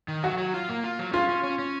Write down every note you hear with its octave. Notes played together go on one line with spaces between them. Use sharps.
D#3
F#3 F#4
F#3
F4
A#3
F4
F#3
C#4 F4
C#4
C#4
C#4